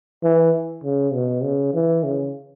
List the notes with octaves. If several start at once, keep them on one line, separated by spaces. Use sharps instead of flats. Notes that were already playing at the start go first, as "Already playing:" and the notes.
E3
C#3
B2
C#3
E3
C#3